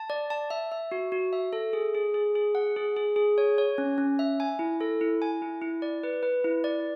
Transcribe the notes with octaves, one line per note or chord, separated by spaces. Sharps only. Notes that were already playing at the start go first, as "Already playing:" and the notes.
Already playing: A5
D5
A5
E5
E5
F#4
F#4
E5
A4
G#4
G#4
G#4
G#4
F#5
G#4
G#4
G#4
C#5
C#5
C#4
C#4
E5
G#5
E4
A4
E4
G#5
E4
E4
D5
B4
B4
E4
D5